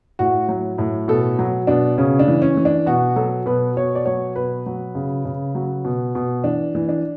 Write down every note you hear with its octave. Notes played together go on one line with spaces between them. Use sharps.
A2 F#4
F#3
A2
B2 A4
F#3
B2 D4
C#3 C#4
D4
E3
C#4
E3
D4
B2 F#4
F#3 A4
B2 B4
B2 C#5
D5
F#3 C#5
B2 B4
F#3
C#3
C#3
F#3
B2
B2
E3 D4
E3
D4